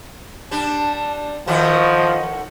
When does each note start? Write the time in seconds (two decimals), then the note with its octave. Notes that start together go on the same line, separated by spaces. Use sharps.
0.51 G3 D4 A5
1.47 A2 D#3 F3 F#4 D#5